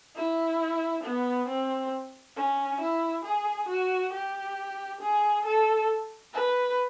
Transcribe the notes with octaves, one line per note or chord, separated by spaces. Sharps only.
E4
B3
C4
C#4
E4
G#4
F#4
G4
G#4
A4
B4